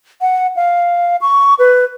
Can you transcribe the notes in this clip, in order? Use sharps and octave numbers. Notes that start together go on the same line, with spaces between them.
F#5
F5
C#6
B4